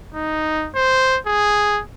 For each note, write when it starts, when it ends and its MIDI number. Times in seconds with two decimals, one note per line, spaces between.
0.15 0.69 63
0.75 1.18 72
1.27 1.81 68